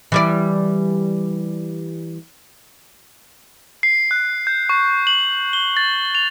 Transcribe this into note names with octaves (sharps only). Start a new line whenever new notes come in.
E3 G3 D5
C7
F#6
G6
C#6
F#7
G7
A6
F7